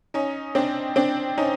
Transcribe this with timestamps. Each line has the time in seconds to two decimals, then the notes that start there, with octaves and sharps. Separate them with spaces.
0.14 C#4 D#4
0.55 C4 D4
0.96 C4 D4
1.38 C#4 D#4